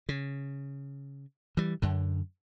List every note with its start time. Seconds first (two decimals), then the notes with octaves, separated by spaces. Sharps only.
0.09 C#3
1.57 E3 G3
1.82 F#2 D3